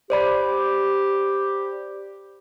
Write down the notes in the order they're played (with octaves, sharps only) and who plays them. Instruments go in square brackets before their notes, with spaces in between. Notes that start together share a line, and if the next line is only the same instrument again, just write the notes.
[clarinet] G4 [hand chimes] C5 D5 B5